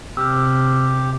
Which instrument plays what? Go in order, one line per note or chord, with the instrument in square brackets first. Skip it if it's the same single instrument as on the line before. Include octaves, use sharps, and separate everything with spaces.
[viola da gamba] C3 [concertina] G4 [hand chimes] E6 F6